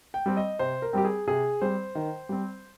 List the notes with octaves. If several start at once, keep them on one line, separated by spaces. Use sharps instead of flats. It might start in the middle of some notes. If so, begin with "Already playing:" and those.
G5
G3 C4
D#5
C3 C5
A#4
G3 C4 G4
G#4
C3 G#4
G3 C4 C5
D#3
G3 C4